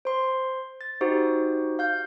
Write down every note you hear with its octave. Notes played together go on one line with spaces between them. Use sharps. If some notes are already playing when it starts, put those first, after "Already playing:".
C5 C6
A6
D#4 F#4 G4 C5
F5 G6